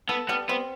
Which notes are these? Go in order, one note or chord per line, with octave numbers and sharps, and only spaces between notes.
B3 A4
G3 B3
B3 C4